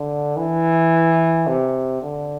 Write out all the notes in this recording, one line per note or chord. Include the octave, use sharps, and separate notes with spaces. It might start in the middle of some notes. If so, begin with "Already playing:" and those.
Already playing: D3
E3
C3
D3